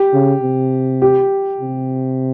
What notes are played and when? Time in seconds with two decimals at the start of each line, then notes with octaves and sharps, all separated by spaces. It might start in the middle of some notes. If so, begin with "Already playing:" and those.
Already playing: G4
0.14 C#3
0.42 C3
1.02 G4
1.61 C3